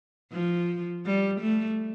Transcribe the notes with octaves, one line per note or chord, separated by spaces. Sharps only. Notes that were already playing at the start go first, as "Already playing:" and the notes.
F3
G3
A3